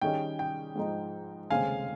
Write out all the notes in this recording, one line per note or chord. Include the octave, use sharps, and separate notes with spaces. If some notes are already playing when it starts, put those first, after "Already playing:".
D#3 G3 C#4 G#4 D#5 G5
G5
G#2 F3 G#3 D#4
F1 D#2 C#3 G#3 C4 F5 G#5